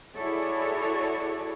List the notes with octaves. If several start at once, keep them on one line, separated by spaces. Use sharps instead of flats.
E4 F#4 G#4 A4 C#5 D5